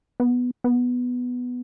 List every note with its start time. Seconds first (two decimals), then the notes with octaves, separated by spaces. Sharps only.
0.20 B3
0.64 B3